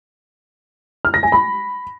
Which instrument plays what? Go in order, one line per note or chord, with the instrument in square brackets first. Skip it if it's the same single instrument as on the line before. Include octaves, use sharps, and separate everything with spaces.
[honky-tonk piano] F6
A#6
G#5
B5